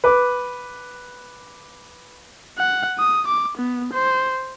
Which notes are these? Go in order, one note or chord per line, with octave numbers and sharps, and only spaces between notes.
B4 D6
F#5
D#6
D6
B3
C5